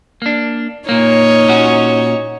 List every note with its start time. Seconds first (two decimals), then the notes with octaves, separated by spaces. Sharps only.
0.22 A#3 D4
0.89 A#2 A#3 D#4 C#5
1.48 A#2 C#4 F#4